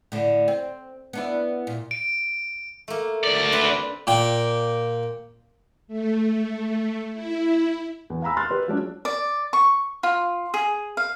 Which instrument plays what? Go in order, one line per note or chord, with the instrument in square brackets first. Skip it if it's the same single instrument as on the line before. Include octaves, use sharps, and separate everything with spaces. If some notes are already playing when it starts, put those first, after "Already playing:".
[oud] A2 D3
C4
B3 D4 E4
A#2
[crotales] D7
[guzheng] A3 A#3
[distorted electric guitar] D2 D5
[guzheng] C4 D4 B4
[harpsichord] A#2 G5
[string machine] A3
E4
[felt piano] E2
F5 G#5 A#5 B5 E6
C6 F6 F#6 A6
G4 B4
F3 F#3 G#3 C#4 D4
[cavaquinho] D5
C#6
F4
G#4
F5